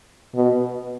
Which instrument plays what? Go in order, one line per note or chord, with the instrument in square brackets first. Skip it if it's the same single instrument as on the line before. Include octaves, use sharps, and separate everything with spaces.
[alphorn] B2